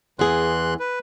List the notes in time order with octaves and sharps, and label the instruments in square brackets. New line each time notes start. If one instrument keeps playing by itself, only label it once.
[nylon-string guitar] E2 G#4 [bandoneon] E3 C6 F#6
[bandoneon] B4